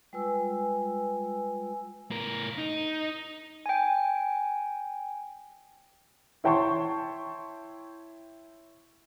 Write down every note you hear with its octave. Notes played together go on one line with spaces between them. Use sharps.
G3 G#3 F4 B4 G#5 E6
A2 A#4
D#4
G5 G#5
E4 C#5 G5 A5 C6 C#6